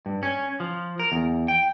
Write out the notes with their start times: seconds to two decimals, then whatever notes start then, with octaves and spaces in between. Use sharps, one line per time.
0.06 G2
0.23 C#4
0.60 F3
1.00 A#4
1.12 E2
1.48 G5